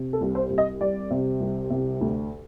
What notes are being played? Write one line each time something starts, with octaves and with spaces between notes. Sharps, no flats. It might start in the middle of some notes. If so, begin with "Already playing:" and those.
Already playing: C3
A4
C2
C5
C2
D#5
G3 D5
C3
C2
C3
D2